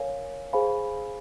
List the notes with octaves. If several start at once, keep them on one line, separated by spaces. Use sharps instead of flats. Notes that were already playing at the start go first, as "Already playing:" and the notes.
Already playing: A#4 C#5 F5 G#5
G#4 C5 F5 G#5 B5